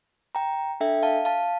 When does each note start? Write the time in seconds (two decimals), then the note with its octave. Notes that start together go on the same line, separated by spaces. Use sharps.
0.35 G5 A#5
0.81 D4 A4 E5 G5
1.03 F5 A5
1.25 F5 A5